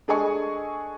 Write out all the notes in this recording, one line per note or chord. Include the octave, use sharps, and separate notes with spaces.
D4 G#4 A4 D#5 G#5 C#6